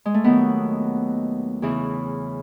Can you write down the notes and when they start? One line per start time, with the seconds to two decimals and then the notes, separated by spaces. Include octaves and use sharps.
0.05 G#3
0.14 A3
0.24 D#2 D#3 F#3 B3
1.62 E2 C#3 E3